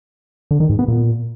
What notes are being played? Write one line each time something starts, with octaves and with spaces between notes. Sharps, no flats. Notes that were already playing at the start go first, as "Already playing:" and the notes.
D3
D#3
G#2
B3
A#2